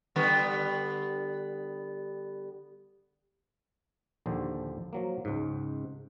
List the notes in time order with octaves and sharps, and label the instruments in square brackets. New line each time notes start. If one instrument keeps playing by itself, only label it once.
[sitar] D3 G3 B3
[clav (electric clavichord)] A#1 D#2 D3 C5
F3 F#3 A#3
C#2 G#2